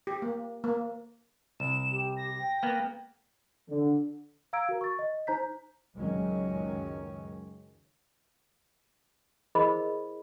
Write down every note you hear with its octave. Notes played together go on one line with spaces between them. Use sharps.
G4
A#3
A#3
C2 E7
G4
A#6
G5
A#3 B3
D3
F5 A#5 E6 G#6 D7
F#4 A#4
C#6 A6
D#5
D#4 C5 A#5 G6 B6
C#2 F#2 D#3 F#3 G#3 C#4
E4 G#4 A#4 C5 D#5 B5